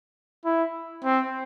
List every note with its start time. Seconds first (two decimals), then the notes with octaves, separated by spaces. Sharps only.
0.45 E4
1.04 C4